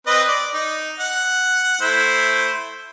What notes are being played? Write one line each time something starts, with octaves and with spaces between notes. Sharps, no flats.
C4 B4 D#5
D5
D#4
F#5
A3 E4 C5